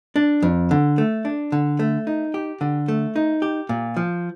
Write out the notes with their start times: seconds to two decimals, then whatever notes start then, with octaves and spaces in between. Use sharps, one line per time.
0.16 D4
0.42 F2
0.71 D3
0.98 A3
1.25 D4
1.52 D3
1.79 A3
2.07 D#4
2.34 G4
2.61 D3
2.88 A3
3.16 D#4
3.42 G4
3.69 A#2
3.97 F3